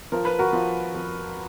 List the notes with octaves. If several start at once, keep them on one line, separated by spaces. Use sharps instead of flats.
F3 A#4
B4
F#4 A#4
F3
F2